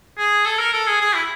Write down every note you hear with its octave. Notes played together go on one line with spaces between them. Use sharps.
G#4
A4
A#4
A4
G#4
G#4
E4